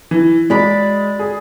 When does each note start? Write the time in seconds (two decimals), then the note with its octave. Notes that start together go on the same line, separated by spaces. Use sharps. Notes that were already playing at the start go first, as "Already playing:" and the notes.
0.11 E3
0.50 G#3 D5 B5 D6
1.19 G#4